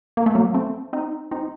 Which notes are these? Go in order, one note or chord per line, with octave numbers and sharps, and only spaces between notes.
A#3
A3
F#3 A#3
A3 C4
C4 D#4
C4 D#4